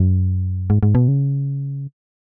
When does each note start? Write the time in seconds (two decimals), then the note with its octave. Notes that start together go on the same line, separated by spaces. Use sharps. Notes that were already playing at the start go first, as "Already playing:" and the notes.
Already playing: F#2
0.70 G#2
0.83 G#2
0.95 B2
1.08 C#3